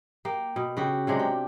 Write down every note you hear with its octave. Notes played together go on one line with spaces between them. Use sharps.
A#3 G4
B2
C#3 F#4 G4
C3 F#3 G#3 D4
G4